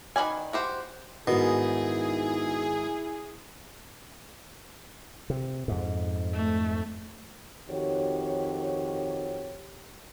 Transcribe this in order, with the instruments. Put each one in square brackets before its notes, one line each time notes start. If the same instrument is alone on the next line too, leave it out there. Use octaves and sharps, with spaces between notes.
[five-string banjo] D#3 B4 D5 G#5
F#4 G4 C5
[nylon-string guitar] G#2 D#3 [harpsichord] B2 [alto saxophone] E4 [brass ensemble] G#4
[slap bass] C3
F2 G#2
[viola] A3
[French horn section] F2 D#3 F#4 G4 C#5